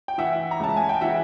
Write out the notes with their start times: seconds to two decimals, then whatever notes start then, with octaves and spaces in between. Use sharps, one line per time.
0.08 G5
0.18 E3 E5 F#5
0.51 A#5
0.60 C#2 A5
0.77 G#5
0.89 G5
1.01 E3 E5 F#5